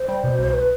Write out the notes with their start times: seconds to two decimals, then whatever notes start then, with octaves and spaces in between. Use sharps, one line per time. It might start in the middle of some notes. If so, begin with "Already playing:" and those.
Already playing: C5
0.08 G3
0.24 B2
0.39 C2
0.53 B4